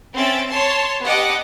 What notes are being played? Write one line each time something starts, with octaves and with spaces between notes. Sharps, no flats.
C4 C#4 E5 A6 D7
C#5 A5 C6
B3 D4 G4 D#5 F#5 D6